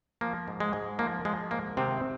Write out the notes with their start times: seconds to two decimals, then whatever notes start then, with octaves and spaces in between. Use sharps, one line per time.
0.21 F3 A#3
0.48 G#2
0.60 G#3
0.73 G#2
0.99 F3 A#3
1.25 F3 G#3
1.51 G#2 A#3
1.77 C3 D#3 C4